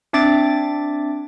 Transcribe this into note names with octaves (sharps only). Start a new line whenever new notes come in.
C4 D4 E5 D6 A6 D7